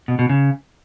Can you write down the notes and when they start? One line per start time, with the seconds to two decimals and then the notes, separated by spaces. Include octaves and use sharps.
0.08 B2
0.19 B2
0.29 C#3